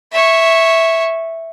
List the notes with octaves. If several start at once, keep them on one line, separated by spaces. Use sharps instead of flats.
C#5 E5